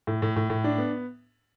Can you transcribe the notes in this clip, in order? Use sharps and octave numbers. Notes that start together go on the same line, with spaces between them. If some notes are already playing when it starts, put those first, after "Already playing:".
A2
A2
A2
A2
D4
B3